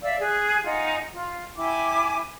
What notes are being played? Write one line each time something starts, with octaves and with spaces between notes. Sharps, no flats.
D5 E5 F5 E6
G#4 F#6
D#4 F4 F#5 G#5
F4
E4 G5 G#5 D6